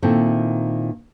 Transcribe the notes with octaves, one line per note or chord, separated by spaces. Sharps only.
A#2 D#3 C4 E4 A4